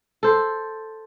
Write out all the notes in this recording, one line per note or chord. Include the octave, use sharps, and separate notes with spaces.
A4 C5